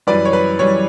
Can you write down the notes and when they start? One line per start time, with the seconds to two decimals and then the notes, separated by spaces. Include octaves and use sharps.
0.07 F#2 E3 G3 B4 D5
0.25 C#5
0.33 B4
0.59 F#2 E3 G3 C#5